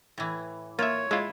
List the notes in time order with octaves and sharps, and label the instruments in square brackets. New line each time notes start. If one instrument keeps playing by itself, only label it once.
[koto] A2 E3
[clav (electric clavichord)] A#3 E5 [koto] F4 [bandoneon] C#5
[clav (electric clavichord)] G#3 F4 [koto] E4